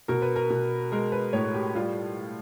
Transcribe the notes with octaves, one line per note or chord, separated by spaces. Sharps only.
B2 A#4
B4
A#4
B2
G#3 A#4
B4
A2 C#5
G4
G3 F4